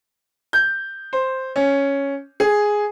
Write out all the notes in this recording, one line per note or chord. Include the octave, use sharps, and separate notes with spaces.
G6
C5
C#4
G#4